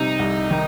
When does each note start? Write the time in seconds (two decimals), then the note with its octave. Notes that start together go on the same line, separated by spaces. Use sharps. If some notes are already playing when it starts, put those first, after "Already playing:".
Already playing: C3 G3 D#4
0.19 C2
0.51 D#3